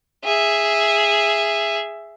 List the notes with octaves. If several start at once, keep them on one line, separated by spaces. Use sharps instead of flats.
G#4 E5